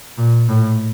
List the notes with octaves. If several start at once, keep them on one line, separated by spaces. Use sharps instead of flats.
A#2
A2